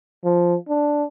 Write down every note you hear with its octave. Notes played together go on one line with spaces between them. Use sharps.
F3
D4